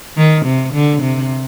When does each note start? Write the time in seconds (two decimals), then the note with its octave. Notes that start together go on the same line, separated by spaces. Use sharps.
0.17 D#3
0.46 C3
0.74 D3
1.02 C3